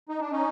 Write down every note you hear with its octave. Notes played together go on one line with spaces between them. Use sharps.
D#4
D4
C#4 D#4